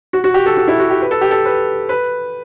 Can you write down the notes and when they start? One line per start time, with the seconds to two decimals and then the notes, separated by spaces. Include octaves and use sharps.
0.13 F#4
0.24 F#4
0.34 G4
0.46 A4
0.57 F#4
0.68 E4
0.79 F#4
0.90 G4
1.02 B4
1.11 A4
1.21 G4
1.31 A4
1.45 B4
1.89 B4